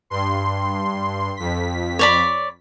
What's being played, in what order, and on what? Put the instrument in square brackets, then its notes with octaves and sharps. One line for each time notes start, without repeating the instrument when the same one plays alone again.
[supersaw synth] G2 C6
F2 B6
[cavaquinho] C#5 D5 B5